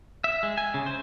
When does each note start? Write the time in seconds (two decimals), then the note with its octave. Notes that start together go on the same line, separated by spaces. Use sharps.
0.24 E5
0.43 G#3
0.58 G#5
0.74 C#3
0.86 C5